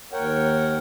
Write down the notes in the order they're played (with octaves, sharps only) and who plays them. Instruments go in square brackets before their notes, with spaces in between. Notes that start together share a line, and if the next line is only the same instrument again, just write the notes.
[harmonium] D#2 A#4 C#5 F#5 G5